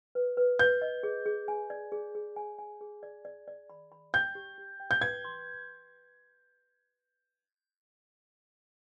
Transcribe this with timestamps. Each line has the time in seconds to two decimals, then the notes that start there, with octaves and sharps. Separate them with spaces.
0.15 B4
0.37 B4
0.59 B4 G6
0.82 D#5
1.03 G#4
1.26 G#4
1.48 G#5
1.70 D5
1.92 G#4
2.15 G#4
2.36 G#5
2.59 G#5
2.81 G#4
3.03 D5
3.25 D5
3.47 D5
3.70 B5
3.92 B5
4.14 G5 G6
4.35 G4
4.58 G4
4.80 G5
4.91 G6
5.01 B4 G#6
5.24 C6